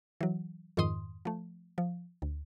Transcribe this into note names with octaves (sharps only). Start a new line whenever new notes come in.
E3 F#3
F2 G#2 D#3 C6 D#6
F3 A3
F3
D2